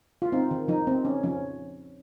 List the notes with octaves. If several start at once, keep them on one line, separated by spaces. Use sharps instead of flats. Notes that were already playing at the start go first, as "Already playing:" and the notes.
F4
C4 D#4
D#3
F3 D#4
C4
C#4
F3 C#4